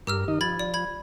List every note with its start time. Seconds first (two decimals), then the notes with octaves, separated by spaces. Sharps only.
0.07 G2 G4 A#4 E6 F6
0.28 D#3 D#4 D#5
0.41 F3 B5 G#6 A6
0.59 D5
0.74 B5 G#6